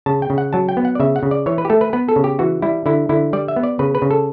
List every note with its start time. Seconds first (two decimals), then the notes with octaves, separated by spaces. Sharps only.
0.06 C#3 A5
0.22 G5
0.30 C#3
0.38 F#5
0.53 F#3 A5
0.69 G5
0.77 B3
0.85 F#5
0.95 D5
1.00 C#3 E5
1.16 F#5
1.23 C#3
1.31 D5
1.46 E3 C#5
1.58 B4
1.65 G4
1.70 A3 A4
1.81 B4
1.93 B3 B4
2.09 A4
2.16 C#3
2.24 G4
2.39 E3 F#4
2.62 G3 E4
2.86 D3 E4
3.09 D3 E4
3.33 G3 D5
3.48 E5
3.56 B3
3.63 D5
3.79 C#3 B4
3.95 B4
4.02 C#3
4.11 A4